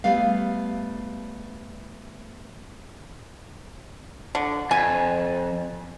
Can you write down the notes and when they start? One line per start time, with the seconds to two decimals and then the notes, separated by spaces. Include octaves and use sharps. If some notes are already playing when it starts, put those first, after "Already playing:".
0.04 G3 A3 B3 F5
4.35 D3
4.71 F2 G#5